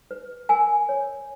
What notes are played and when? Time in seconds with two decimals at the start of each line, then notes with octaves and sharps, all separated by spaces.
0.11 B4
0.49 A#4 G#5
0.89 C#5